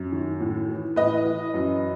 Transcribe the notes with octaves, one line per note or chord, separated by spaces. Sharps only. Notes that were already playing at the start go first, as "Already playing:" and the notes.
Already playing: F#2
D#3
A2
E3
A2 B4 D#5
E3
F#2